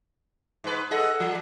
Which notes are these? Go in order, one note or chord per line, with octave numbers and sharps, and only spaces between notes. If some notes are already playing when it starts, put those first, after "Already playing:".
G#2 B4
G#4 A4 D#5 F#5
F3